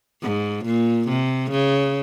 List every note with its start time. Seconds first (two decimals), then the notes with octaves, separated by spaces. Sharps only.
0.22 G#2
0.65 A#2
1.08 C3
1.51 C#3